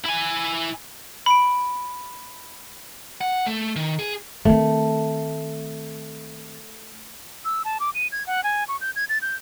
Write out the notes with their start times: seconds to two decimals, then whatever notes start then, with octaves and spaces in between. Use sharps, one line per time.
0.06 E4 G#5
1.26 B5 D7
3.21 F#5
3.46 A3
3.76 D#3
3.99 G#4
4.45 D#3 A3 C4
7.45 E6
7.65 A5
7.80 D6
7.94 D#7
8.12 G#6
8.26 F#5
8.43 G#5
8.68 C#6
8.81 G6
8.96 G#6
9.09 A6
9.22 G6